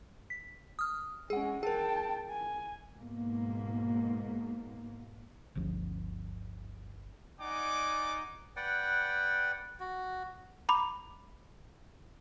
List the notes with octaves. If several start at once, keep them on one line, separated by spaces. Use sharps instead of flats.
B6
D#6 F6
G#3 C#4 G#4 F#5
G#4 A#4 G5 A5
G#5
G#2 B2 A#3
G1 D2 F3 C#4
D#4 D5 F#5 G#5 D6
B4 D5 F#5 G5
F#4
A#5 B5 D6